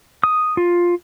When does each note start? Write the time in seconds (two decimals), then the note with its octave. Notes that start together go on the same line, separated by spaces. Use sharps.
0.24 D#6
0.57 F4